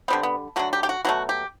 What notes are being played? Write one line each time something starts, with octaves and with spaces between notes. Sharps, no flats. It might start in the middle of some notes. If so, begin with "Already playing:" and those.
D3 G3 B3 C4
B3
D3 F#3 A3 F#4
G4
G4
F#4
B2 F#3 A3 F#4
G4